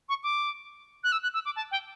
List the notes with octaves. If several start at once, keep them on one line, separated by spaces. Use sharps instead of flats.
C#6
D6
F#6
E6
F#6
E6
D6
A5
G5